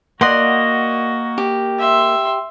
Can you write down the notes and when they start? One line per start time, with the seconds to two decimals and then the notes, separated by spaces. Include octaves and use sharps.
0.21 A#3 F#4 D5 D#5 F#5 C6
1.38 G4
1.79 E5 C6